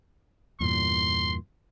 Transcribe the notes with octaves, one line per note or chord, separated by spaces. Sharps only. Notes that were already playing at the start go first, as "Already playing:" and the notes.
E2 G2 A#2 C6